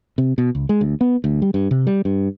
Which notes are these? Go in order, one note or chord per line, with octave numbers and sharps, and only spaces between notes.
C3
B2
C#2
G#3
D2
B3
D2
G3
G2
C3
G3
G2